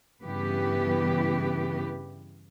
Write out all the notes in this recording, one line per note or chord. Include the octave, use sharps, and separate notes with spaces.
G2 C#3 E3 B3 G4 B4